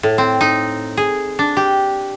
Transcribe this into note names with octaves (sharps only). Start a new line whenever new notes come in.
A2
C4
D#4
G#4
D4
G4